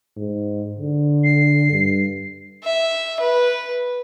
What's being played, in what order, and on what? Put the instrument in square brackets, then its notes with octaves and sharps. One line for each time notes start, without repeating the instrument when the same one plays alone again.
[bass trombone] G#2
D3
[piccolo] C7
[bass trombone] G2
[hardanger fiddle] E5
B4